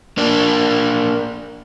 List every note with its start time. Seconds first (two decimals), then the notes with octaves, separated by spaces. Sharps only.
0.18 A#3 D4